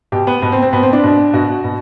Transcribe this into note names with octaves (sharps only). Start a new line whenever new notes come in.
B2 G4
B3
B2 B3
C4
C4
B2 B3
C4
D4
B2
B2 F#4
B2